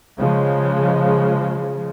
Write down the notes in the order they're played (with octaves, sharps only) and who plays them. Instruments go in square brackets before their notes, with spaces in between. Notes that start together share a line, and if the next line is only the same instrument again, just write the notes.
[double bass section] C#3 F3 G#3